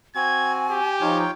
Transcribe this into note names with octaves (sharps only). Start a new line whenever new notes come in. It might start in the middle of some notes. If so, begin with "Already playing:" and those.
C4 F#4 G#5 G#6
G4
F3 D#4 F4 C#5 G5